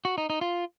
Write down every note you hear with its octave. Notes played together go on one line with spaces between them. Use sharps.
F#4
D#4
D#4
F4